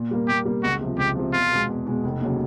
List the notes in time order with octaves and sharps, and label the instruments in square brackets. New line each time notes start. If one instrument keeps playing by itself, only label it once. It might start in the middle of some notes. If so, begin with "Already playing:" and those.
Already playing: [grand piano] A#2
G3 A#3
[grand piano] A#2 [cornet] G4
[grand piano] G3 A#3
[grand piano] C#2 [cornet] F#4
[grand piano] C3 F3
[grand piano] C#2 [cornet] G4
[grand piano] C3 F3
[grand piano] E2 [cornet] F4
[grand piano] B2 G#3
E2
B2 G#3
F1
D#2 C#3 F#3